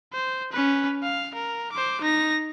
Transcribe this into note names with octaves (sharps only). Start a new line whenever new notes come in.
C5
C#4 B4
F5
A#4
C5 D6
D#4 A#6